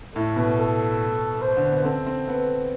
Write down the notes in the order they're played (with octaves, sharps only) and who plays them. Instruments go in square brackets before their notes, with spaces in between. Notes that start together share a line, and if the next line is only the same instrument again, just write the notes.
[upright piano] A2 [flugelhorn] A4
[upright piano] B2
[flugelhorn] A4
C5
[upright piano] D3
B3
[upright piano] C4 [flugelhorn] A4
[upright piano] C4
B3